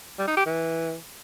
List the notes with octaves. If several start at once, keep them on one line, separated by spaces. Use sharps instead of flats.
G3
D#4
G4
E3